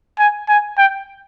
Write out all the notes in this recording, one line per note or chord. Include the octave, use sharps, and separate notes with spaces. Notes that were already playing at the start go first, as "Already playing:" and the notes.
G#5
G#5
G5